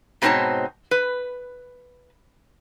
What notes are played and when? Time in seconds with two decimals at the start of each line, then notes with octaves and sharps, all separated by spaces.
0.22 G#2 B2 C4 D#4 C#5 A5
0.91 B4